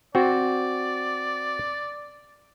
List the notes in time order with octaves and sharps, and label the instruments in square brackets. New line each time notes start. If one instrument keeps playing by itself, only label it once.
[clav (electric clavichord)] C4 F#4 [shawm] D5